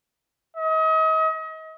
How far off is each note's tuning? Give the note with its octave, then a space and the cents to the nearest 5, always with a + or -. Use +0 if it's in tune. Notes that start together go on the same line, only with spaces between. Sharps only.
D#5 +35